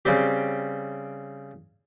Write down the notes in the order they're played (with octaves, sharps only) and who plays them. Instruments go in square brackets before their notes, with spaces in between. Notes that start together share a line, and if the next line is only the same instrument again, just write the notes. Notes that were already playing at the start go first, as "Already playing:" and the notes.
[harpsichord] C#3 G3 C4 G4